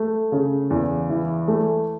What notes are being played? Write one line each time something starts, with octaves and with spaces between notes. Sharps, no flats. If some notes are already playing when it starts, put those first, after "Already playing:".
Already playing: A3
C#3
E2
E3
A3